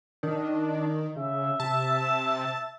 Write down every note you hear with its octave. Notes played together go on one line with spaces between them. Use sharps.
D#3 D4
C#3 E5
C3 A5